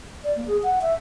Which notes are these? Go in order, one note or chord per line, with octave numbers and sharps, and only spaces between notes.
D5
A#3
G#4
F#5
E5